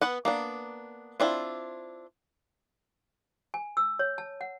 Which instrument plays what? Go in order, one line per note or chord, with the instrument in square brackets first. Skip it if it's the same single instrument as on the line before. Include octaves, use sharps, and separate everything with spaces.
[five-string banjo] B3 B4 F#5
A#3 B3 D4
C4 D4 E4 F4
[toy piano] G#5
E6
C#5
A5
F#5